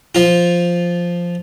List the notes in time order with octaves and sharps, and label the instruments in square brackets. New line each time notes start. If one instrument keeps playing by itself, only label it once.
[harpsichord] F3 F4